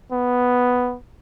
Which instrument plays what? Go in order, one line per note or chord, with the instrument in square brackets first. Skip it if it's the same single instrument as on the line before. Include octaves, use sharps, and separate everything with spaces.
[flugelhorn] B3